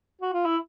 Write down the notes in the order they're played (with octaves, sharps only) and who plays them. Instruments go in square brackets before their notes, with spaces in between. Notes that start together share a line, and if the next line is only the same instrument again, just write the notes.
[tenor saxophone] F#4
F4
E4